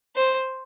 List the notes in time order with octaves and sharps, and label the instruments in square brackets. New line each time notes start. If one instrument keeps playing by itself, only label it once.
[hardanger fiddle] C5